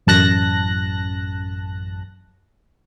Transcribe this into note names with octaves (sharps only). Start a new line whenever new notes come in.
A1 F#2 A5 F#6 A#6